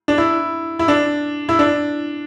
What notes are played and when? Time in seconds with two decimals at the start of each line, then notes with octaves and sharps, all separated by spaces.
0.08 D4
0.18 E4
0.79 E4
0.88 D4
1.49 E4
1.59 D4